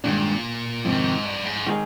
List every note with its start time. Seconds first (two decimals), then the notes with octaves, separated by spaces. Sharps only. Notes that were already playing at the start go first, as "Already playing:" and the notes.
0.04 G2 A#2 D#3 G#3 D4
0.85 F2 G#2 C3 D#3
1.25 G2
1.45 G#2
1.67 D#3 G#3 D#4 G#4